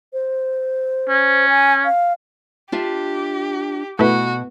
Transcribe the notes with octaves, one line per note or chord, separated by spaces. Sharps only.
C5
C#4
G#5
F5
D4 F4 G4 E5
B2 A3 E4 F#4 B4